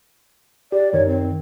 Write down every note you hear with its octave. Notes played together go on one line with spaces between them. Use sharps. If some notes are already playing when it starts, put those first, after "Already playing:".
G4 D5
F#2 D#3 C#5
C4